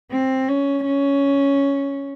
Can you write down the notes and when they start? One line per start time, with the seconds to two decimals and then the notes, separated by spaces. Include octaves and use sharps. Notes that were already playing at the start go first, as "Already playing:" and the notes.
0.11 C4
0.48 C#4
0.86 C#4